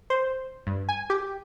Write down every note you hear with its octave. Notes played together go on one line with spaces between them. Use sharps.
C5
G2
G#5
G4